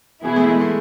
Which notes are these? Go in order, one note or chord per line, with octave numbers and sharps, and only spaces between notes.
B2 E3 B3 E4 G#4
A3
G#3
A3